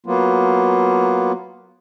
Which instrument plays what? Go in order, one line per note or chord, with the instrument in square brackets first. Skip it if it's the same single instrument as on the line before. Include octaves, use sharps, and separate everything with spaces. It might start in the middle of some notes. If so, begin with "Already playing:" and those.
[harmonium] F#3 A#3 B3 F4